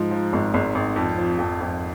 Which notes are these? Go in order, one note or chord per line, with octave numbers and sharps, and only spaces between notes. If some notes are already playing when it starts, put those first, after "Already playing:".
Already playing: G#2 F3
F3
G#1
G#1
G#1
F2
F3
F2
F2